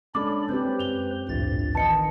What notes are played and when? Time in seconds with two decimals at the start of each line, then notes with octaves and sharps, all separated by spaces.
0.15 G#3 C#4 D4 A4 D5 B5 D6
0.49 C4 C#4 G4 B4 C5
0.79 F#2 G#3 F7 G7
1.29 A1 D2 G2 A#2 A6
1.75 D#3 E3 D#5 A5 C#7